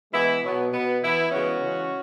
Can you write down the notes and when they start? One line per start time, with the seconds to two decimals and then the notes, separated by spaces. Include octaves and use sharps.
0.13 E3 G#3 B3 E4
0.44 B2 F#3 B3
0.73 B2 B3
1.03 E3 B3 E4
1.32 C#3 E3 G#3 B3 C#4 F#4
1.61 C#3 E3 G#3